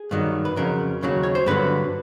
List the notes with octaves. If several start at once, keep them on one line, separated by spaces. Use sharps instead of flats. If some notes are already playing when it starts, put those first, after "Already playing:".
Already playing: G#4
G2 D#3 F#3
B4
F2 C#3 F#3 A#4
D#2 C#3 F#3
C#5
C5
G2 D3 F#3 B4